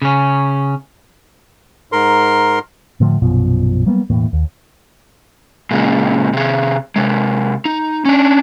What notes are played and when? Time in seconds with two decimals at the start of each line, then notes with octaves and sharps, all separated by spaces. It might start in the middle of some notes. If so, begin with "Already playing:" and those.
0.02 C#3 C#4
1.92 G#2 A#4 C6
3.00 A2 D3 F3 A3
3.22 A#1 F#2 B2 F3
3.86 F#3 G3 A#3 B3
4.10 E1 A2 E3 A#3
4.33 D#2
5.71 A#2 C#3 G#3
6.33 C3 G#4
6.96 C3 G#3
7.65 D#4
8.05 C#4 D4